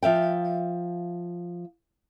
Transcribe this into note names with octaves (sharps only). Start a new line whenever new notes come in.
F3 E5 F5 G5